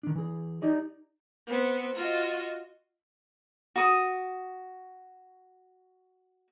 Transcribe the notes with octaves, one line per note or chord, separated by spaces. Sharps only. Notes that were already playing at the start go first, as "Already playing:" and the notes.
D#3 D4
E3 G#4
D#4 G4 D5 D#5
B3 C4
F4 F#4 D#5
F#4 D#6